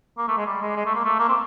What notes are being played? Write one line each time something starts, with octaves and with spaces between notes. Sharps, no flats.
A#3
A3
G#3
G3
G#3
G#3
A3
A#3
A3
A#3
C4